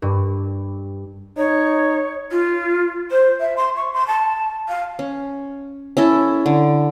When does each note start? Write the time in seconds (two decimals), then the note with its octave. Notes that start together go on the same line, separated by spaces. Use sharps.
0.02 G2
1.38 D#4 C#5
2.31 F4
3.10 C5
3.40 E5
3.56 C6
3.76 C#6
3.93 C6
4.07 A5
4.68 F5
4.99 C#4
5.97 C#4 E4 A4
6.46 D3